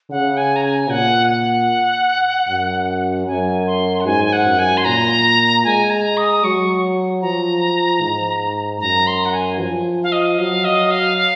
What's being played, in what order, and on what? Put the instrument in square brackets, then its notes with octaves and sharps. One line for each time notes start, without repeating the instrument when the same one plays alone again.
[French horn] C#3 [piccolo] F#5
[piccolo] G#5
A#5
G#5
[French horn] A#2 [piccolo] F#5
[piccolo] F#5
[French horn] F#2
[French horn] F#2 [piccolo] G#5
[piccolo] C6
F#5
[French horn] G#2 [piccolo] G#5
[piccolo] G#5
F#5
[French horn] F#2
[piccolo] G#5
C6
[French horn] A#2 [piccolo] A#5
[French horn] G#3 [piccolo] G#5
[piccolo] A#5
D#6
[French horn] F#3 [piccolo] C#6
[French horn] F3 [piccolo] A#5
[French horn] G#2
[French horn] F#2 [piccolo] A#5
[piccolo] C6
F#5
G#5
[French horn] F3 [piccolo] G#5
[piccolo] F5
D#5
[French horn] F#3 [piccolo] F5
[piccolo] D#5
F5
F5